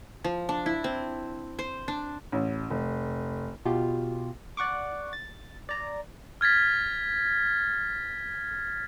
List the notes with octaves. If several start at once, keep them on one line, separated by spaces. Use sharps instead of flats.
F3
D4
E4
C4
C5
D4
A1
F1
B2 F4 G4
D5 F#5 C#6 D6
A6
D5 A#5
F6 G#6 A6 B6